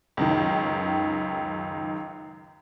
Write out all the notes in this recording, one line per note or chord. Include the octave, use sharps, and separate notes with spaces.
C#2 F#2 D#3